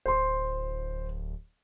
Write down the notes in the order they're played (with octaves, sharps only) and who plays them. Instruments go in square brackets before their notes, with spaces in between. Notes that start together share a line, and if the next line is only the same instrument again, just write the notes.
[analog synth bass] D1 [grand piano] C5 C6